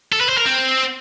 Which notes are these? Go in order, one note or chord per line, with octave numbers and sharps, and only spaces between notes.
A4
B4
C5
A#4
C4